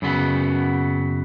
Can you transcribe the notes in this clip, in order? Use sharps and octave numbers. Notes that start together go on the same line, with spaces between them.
F#2 C#3 F#3 B3